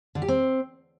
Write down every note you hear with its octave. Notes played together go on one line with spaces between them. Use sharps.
D3
G4
C4